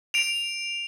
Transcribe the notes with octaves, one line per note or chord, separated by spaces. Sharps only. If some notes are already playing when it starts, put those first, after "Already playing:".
D7 F7